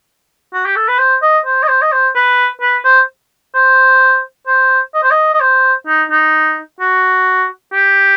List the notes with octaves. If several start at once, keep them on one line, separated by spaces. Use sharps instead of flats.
F#4
G4
A4
B4
C5
D#5
C5
D#5
C5
D#5
C5
B4
B4
C5
C5
C5
D#5
C5
D#5
D#5
C5
D#4
D#4
F#4
G4